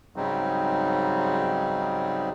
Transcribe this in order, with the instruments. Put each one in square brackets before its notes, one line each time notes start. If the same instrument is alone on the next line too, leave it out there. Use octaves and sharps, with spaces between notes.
[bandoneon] G#2 C#3 F#3 G3 C4 D#4